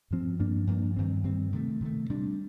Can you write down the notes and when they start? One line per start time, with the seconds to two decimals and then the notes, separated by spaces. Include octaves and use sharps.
0.11 G2 F3 C4
0.39 G2 F3 A#3 D4
0.67 G2 F3 A#3 D4
0.96 G2 D#3 G3 C4
1.24 G2 D#3 G3 C4
1.53 C3 D#3 A3
1.80 C3 D#3 A3
2.10 C3 G3 D4